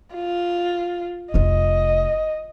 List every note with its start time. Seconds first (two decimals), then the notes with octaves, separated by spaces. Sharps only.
0.15 F4
1.34 F1 F4 D#5